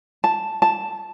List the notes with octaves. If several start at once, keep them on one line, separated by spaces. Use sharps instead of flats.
A5
A5